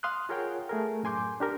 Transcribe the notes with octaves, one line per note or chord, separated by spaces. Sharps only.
F5 C6 D#6 F#6
F4 G#4 A#4 C#5 F#5 G5
A3 G#4 A#4
F#2 A2 G#5 C6 D6 G6
D4 G4 A#4